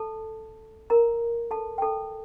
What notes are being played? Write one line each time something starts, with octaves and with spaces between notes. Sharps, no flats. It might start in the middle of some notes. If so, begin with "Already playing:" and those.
Already playing: A4 A5
A#4 A#5
A4 A5
G5
A4 A5